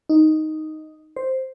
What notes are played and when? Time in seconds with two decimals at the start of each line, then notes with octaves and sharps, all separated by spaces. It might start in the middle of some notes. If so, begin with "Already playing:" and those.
0.09 D#4
1.16 C5